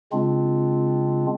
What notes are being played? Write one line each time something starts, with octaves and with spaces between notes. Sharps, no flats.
C#3 G#3 C4 D4 F4